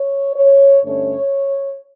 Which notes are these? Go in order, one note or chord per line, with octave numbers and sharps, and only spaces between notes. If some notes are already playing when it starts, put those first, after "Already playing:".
Already playing: C#5
C#5
G2 D3 A3 C#4 C#5